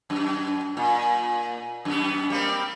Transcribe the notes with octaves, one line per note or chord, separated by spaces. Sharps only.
F#2
A#2
F#2 B3
G3 A#3 C4